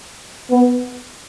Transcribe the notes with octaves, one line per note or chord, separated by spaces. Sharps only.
B3